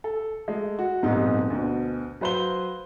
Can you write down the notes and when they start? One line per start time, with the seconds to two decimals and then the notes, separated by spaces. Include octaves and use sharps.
0.04 A4
0.48 G#3 A3
0.79 F#4
1.02 D#1 B1 F2 G#2 G3 D#4
1.50 D2 B2
2.21 F#3 B4 C5 F5 G7